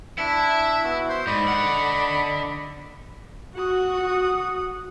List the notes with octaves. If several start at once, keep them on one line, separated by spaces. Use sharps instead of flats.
D4 E4 E5
B3 F#4
C5
G#2 D5 D#5 B5
D3 F#5
F#4 F#5 D#6